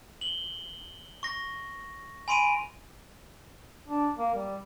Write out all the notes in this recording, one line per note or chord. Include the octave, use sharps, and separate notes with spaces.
F#7 G7
C#6 A#6
G#5 B5 C6 D7 D#7 F7
D4
A#3
G3